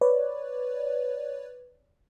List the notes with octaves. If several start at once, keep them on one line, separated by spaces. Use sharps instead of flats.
B4 C#5 D5